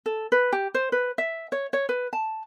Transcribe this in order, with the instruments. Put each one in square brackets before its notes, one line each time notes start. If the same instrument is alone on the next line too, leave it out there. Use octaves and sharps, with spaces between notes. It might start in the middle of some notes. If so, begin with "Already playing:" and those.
[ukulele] A4
B4
G4
C5
B4
E5
C#5
C#5
B4
A5